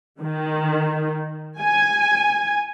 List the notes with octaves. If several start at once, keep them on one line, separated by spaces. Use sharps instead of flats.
D#3
G#5